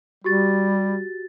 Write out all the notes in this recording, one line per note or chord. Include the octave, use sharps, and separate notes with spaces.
G3 F#4 G4 A6